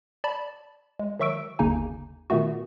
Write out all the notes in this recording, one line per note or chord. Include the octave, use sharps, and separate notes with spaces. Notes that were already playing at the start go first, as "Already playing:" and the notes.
D5 A5 B5
G#3
D#3 F#3 E5 C#6 E6 D7
G1 D#2 C#3 A#3 D#4 G#5
A#2 D#3 A3 B3 F#4